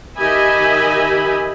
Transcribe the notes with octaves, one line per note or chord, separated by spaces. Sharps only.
D#3 G4 D#5 E5 G#5 B5